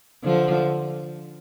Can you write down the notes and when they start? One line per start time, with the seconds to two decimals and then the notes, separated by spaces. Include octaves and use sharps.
0.24 D3 F3